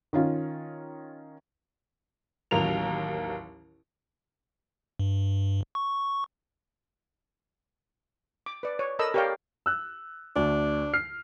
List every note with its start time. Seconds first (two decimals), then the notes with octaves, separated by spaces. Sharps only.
0.13 D#3 C#4 F4
2.51 A1 D#2 F#3 A#4 F7
4.99 G2
5.75 C#6
8.46 D6
8.63 B4 D5
8.79 C#5
8.99 A4 A#4 D#5 A5 B5 E6
9.14 G4 A#4 C#5 D5 F5 G5
9.66 E6 F#6
10.36 D2 D4
10.94 F6 C7